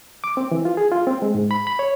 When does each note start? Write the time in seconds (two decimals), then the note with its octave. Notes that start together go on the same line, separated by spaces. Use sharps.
0.24 D6
0.37 C4
0.51 E3
0.65 F4
0.77 G#4
0.92 F4
1.07 C4
1.22 G#3
1.35 G#2
1.51 B5
1.67 B5
1.79 C#5